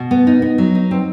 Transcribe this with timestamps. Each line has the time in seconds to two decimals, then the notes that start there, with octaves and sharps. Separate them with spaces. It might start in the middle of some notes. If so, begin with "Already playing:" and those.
Already playing: B2
0.11 B3
0.27 D#4
0.42 B3
0.58 F#3
0.75 D#4
0.91 C4